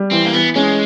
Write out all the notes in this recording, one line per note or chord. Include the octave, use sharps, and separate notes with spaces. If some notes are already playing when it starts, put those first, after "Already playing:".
Already playing: G3
E3 C4
A#3
E3 B3
G#3 C#4